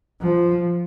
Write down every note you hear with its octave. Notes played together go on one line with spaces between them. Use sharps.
F3